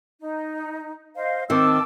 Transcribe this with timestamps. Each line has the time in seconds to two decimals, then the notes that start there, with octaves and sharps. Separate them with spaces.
0.21 D#4
1.15 C5 D#5 F5
1.50 D#3 C4 A5 D6 E6